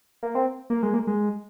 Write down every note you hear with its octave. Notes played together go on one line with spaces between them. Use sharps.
A#3
C4
A#3
G#3
A#3
G#3